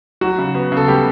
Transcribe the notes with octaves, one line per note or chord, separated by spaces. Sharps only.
F#3 F#4
C#3
B3
C#3 A4
G3 B3 G4